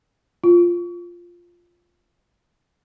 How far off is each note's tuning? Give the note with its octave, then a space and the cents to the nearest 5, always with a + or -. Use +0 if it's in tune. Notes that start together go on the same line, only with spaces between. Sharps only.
F4 +0